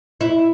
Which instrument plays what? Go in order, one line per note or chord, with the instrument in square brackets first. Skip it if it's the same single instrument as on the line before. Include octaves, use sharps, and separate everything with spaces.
[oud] E4